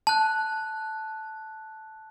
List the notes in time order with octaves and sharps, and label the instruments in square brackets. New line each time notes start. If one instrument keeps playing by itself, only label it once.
[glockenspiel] A5 F#6